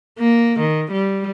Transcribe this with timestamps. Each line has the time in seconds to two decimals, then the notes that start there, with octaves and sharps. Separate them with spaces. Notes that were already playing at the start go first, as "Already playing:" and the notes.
0.19 A#3
0.60 D#3
0.92 G3